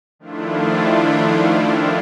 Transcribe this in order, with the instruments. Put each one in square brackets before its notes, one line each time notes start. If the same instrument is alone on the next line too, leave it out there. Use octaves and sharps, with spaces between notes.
[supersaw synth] D#3 F3 A3 D4 E4 F4